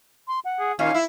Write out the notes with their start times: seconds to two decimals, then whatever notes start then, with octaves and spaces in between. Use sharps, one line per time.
0.28 C6
0.45 F#5
0.60 G#4
0.79 D#2 A#2 C#4 F5
0.94 E4 E5